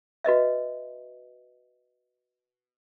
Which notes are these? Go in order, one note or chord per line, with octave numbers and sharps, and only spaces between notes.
F#4 B4 D#5 E5